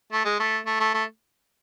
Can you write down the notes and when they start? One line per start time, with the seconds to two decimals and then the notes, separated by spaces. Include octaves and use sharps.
0.13 A3
0.25 G#3
0.40 A3
0.66 A3
0.80 A3
0.94 A3